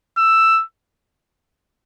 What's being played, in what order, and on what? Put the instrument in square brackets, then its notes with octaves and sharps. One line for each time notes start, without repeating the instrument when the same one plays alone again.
[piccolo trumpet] E6